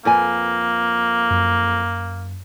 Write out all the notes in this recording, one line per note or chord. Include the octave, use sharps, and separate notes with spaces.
F2 A#3 B4 G#5
F#2